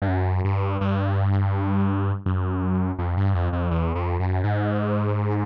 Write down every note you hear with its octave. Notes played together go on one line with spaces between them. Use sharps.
G2
F#2
G2
G2
F#2
F2
G2
F2
F2
E2
F2
F#2
G#2